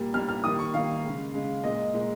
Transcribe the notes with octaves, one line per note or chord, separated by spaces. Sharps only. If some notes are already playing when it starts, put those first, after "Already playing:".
Already playing: A#2 G3 A#3
A#2 G3 A#3 F6
F6
D#3 G3 A#3 D#6
C#6
D#3 G3 A#3 F5
C#3 G#3
C#3 G#3
A#2 G#3 D#5
A#2 G#3